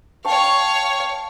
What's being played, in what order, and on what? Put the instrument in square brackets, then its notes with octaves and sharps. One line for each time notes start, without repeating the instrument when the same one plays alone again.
[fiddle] C#5 F5 [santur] G5 A5 C#6